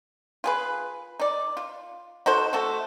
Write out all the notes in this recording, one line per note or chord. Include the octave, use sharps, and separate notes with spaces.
F4 G#4 B4
D#4 D5
F4
D#4 F#4 A4 C5
A3 F#4 A4